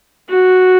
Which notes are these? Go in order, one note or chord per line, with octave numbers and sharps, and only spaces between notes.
F#4